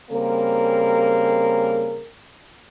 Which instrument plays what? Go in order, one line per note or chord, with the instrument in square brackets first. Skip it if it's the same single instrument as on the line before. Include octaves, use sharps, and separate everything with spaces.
[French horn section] C#3 G3 A#3 C4 G#4 A#4